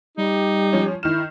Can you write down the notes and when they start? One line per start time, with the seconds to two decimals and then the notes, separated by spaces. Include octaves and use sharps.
0.18 G3 D#4 G4
0.73 F3 C#4
1.03 D#3 E4 F6 E7